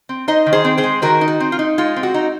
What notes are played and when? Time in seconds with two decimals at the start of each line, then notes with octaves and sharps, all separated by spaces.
0.09 C4
0.28 D#4 C5 D#5
0.46 D#3
0.53 G#4 C5
0.65 C4
0.78 G#4 C5
0.84 G#3
1.02 D#3 F#4 A#4
1.21 D#4
1.28 F#4
1.40 C4
1.52 F4
1.59 D#4
1.78 G#3 F4
1.96 C4
2.03 F#4
2.14 D#4